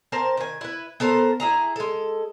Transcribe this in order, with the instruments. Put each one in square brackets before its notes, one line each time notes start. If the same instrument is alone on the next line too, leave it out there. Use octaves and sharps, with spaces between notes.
[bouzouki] C4 A#4 C5 A5
D#3 G#5
E4 B4
B3 A4 A#4 C5
E4 G#4 A#5
G#3 A4